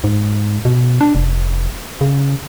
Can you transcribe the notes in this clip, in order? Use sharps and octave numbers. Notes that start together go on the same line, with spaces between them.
G#2
B2
D4
F1
C#3